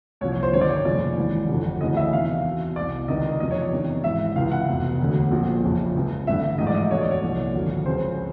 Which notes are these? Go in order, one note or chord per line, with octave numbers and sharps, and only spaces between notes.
C2 A#2 F3 C#5
C#5
C5
G1 G2 D#3 C#5
D5
C#5
F1 D#2 C#3 F3 D5
G#1 G#2 E3
G1 F2 D3 F3
D2 C#3 E3 D#5
E5
E2 C3 D#3 F5
E2 B2
C2 B2 D5
C#2 C3 D#3 D#5
F1 E2 C3 F3 D#5
C#5
D5
E2 C3 D#3
G#1 G#2 E3 E5
C#2 C3 E3 F5
F#5
F1 E2 B2
E1 D2 D3
A#1 A#2 F3
F#1 F2 C#3 F3
C#2 C#3 F3
A1 G2 D3 E5
A1 G#2 F3 D#5
D5
D#5
E1 D2 D3 C#5
D5
C#5
C2 A#2 F3
G#1 F#2 D3 F3
C#2 C#3 F3 C5